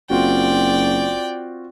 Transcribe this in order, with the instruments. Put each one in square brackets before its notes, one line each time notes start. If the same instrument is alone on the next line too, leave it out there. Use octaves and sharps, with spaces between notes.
[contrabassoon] F#1 [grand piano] C4 F4 F#4 [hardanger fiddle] D5 G5